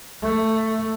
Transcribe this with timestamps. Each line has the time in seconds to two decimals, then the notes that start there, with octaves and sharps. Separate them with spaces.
0.22 A3